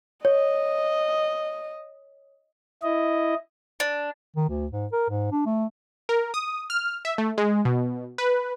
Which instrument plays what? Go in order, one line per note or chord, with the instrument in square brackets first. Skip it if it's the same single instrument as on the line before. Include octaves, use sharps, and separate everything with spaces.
[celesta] C#5 [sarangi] D#5
[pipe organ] E4 D#5
[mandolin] D4
[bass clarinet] D#3
D2
G#2
A#4
G#2
D4
A3
[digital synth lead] A#4
D#6
F6
E5
A3
G#3
B2
B4